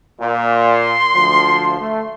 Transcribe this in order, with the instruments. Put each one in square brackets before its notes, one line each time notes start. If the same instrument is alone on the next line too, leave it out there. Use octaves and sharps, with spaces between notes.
[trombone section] A#2
[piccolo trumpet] C6
[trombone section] D2 F3
A3